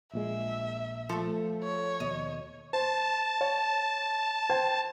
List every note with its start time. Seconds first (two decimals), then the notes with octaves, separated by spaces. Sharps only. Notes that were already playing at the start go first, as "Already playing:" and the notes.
0.13 A#1 A#2 G#3 E5
1.09 F3 A3 A4
1.63 C#5
2.00 D#2 B2 D#5
2.73 C5 A5
3.41 C#5
4.50 C5 G5 G#6